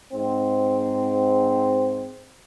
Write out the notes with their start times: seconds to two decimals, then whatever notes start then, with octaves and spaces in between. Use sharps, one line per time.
0.13 G#2 C4